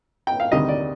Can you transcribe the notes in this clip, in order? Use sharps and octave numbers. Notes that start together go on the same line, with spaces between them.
G5
F5
D2 C3 D#3 G3 D#5
D5